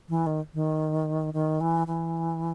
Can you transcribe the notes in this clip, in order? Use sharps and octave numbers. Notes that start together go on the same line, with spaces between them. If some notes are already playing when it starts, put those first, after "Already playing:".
E3
D#3
D#3
D#3
E3
E3